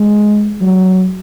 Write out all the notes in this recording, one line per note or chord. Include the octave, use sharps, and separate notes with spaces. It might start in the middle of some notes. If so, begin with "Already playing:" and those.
Already playing: G#3
F#3